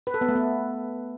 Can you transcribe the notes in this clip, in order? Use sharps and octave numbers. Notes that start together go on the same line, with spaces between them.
B4
A4
B3
A3
B3